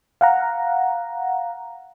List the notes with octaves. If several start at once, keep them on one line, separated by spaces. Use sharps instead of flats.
F5 F#5 A#5